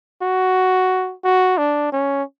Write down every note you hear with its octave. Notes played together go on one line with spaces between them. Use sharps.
F#4
F#4
D4
C#4